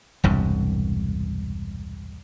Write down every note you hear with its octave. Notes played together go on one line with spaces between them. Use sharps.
E1 C2 G2